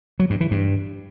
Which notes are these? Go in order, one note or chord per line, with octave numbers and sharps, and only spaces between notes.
F#3
G2
E3
G2